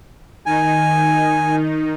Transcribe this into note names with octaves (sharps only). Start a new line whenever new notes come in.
D#3 D#4 G#5